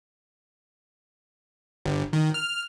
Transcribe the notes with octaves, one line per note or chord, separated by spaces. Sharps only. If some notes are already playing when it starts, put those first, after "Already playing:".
G1
D#3
F6